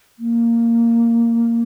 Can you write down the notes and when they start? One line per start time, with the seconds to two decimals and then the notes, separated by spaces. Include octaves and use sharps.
0.18 A#3